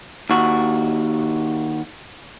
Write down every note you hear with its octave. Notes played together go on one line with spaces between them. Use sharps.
D#2 F#4